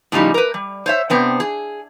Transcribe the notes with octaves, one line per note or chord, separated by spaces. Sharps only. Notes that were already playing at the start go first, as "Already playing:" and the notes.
A2 C#3 F3 G3 D#4
A#4 B4
G3
C5 C#5 E5
C3 B3 C4 D4
G#4